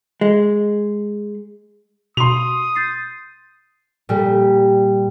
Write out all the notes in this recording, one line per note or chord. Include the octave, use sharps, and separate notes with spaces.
G#3
B2 C6 D#6 F7
G6 A6 C7
A#2 G3